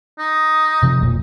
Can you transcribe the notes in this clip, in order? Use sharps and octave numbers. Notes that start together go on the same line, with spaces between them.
D#4
C3 F3
F1 B1 A#2